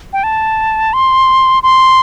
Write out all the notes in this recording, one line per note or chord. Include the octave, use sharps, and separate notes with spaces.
G5
A5
C6
C6